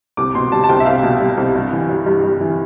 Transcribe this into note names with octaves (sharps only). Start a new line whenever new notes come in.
C2 D6
B2 C6
G3 A5
A5
C2 G5
E5
C2 F5
B2
G3
C2
G2
E3
G3
G2
G2
E3